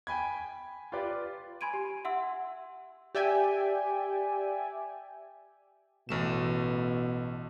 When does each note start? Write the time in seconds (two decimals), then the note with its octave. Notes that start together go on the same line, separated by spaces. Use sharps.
0.07 G5 G#5 B5 G#6
0.92 F4 G4 B4 D5
1.61 G#5 B5 C6 G#6 D7 D#7
1.74 G4
2.05 E5 F#5 C6 E6
3.15 G4 D5 E5 G5 G#5
6.09 A1 B2 A3 E7